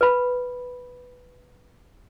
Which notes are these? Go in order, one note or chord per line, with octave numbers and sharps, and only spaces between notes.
B4 B5